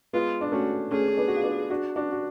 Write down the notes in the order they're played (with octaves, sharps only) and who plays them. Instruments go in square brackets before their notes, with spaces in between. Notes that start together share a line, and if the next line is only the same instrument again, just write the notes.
[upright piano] G#3 B3 [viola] F4
[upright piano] D4
[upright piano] A3 C#4 [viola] F#4
[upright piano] A3 C#4 [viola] G#4
[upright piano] C#4
B3 D4
F#4
F4
B3 D4
D4 F#4
D4 F#4
F#4